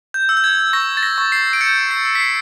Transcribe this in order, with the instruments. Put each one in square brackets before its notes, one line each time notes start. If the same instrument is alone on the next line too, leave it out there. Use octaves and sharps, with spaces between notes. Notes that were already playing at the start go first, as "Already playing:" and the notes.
[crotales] G6
E6
G6
G#6
C#6 A#6
A6
A#6
C#6
C7
D7
G6 C#7
C7
E6
B6
C7